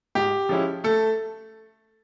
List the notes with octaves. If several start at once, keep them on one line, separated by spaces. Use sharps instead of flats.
G#2 G4
F3 G#3 C#4 E4
A3 A4